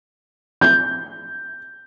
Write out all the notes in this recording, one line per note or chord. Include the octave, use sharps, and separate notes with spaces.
G6